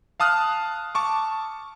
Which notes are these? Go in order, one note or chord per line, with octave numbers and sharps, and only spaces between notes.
F5 A5 D#6 F6 F#6
A5 C#6 D6